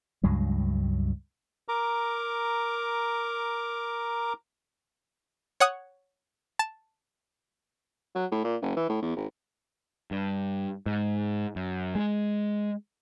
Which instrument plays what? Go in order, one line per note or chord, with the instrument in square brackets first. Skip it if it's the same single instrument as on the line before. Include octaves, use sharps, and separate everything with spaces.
[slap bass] C#2 G2 F#3 G#3
[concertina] A#4 A#5 D6
[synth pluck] C#5 F#5 D#6
A5
[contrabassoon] F#3
A2
A#2
F#1
E3
A2
E2
G#1
[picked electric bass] G2
G#2
F#2
G#3